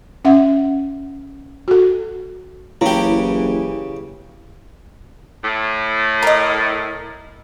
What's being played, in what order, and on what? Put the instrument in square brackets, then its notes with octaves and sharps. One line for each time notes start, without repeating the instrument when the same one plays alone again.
[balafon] C#4 E5 F#5
F#4 A4
[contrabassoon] F#1 [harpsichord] C#3 G4 [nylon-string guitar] E3 [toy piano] E4
[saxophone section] A2
[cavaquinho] A#4 D#5